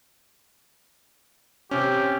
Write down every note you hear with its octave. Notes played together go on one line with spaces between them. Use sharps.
C3 C#4 G4